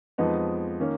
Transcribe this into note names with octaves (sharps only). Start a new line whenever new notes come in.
F2 F3 G#3 B3 D#4
D#3 A#3 C#4